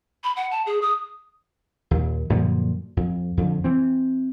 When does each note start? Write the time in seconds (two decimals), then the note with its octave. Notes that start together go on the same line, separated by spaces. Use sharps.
0.24 B5
0.36 F#5
0.51 A5
0.66 G#4
0.82 D#6
1.91 D#2 A#2
2.30 F#2 A#2 D3 F3
2.97 F2
3.37 F2 D3
3.64 E3 C4